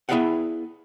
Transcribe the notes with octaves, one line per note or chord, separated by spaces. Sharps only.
B3 E4 G#4 D5 F5 F#5